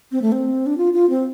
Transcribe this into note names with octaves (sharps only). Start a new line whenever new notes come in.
C4
A3
C4
D4
F4
F4
C4